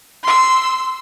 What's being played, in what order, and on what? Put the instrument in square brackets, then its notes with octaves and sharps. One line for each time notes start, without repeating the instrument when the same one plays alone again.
[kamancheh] C6 E6